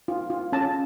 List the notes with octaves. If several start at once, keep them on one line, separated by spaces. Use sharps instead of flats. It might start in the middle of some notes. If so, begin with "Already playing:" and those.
F4
F4
C#4 A5